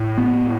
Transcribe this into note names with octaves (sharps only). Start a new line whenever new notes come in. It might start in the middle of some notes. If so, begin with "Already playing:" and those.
Already playing: A2
B3